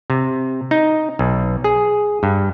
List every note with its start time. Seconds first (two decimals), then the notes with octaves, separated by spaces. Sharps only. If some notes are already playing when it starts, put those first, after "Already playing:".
0.10 C3
0.71 D#4
1.19 B1
1.64 G#4
2.23 G2